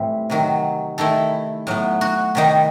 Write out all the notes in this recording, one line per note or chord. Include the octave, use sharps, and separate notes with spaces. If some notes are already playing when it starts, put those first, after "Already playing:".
Already playing: A2 E3 G3 C4
C3 D#3 F#3
D#3 A3 E4 A4
A2 F#3 B3
F#4
C3 D#3 G3 D#4